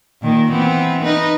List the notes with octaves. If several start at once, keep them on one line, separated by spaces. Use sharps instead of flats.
A#2 D#3 A#3
E3 B3 C4
D#4 B4